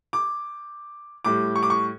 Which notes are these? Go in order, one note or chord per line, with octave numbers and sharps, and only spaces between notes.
D6
A2 G3 D6
C#6
D6
C#6